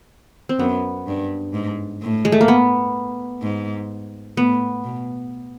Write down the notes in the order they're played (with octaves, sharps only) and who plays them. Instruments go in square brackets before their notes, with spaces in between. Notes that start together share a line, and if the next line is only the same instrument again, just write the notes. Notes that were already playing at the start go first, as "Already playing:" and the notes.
[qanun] C4
[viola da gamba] F#2 [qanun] B3
[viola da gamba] G2
G#2
A2
[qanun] G#3
A3
A#3
B3
[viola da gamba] G#2
[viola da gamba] A2 [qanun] B3
[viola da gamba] B2